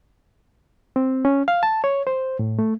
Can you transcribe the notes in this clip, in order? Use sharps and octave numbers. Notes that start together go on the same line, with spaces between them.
C4
C#4
F5
A5
C#5
C5
A2
A3